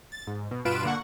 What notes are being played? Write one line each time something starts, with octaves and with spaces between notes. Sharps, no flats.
A6
G#2
B2
G2 B2 F4 B4 D7 E7
D3 A#3 F#5 C#6